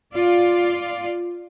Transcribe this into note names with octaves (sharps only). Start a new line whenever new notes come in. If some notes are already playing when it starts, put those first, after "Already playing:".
F4 D5